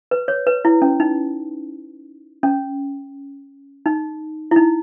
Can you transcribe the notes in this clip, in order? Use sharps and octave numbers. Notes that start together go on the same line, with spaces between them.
B4
C#5
B4
E4
C#4
D#4
C#4
D#4
E4
D#4